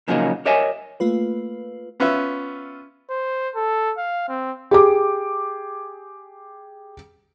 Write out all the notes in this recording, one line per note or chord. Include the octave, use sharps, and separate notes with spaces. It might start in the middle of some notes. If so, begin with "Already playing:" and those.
A#2 C#3 F3 F#3 A#3 D#4
G4 A#4 C#5 D#5 E5 G#5
A3 A#3 F4 B4
B3 C#4 F4 B4 E5
C5
A4
F5
C4
G4 G#4 D6